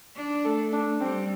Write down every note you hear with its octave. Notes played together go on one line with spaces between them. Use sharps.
D4
A3 A4
D4
G3 C4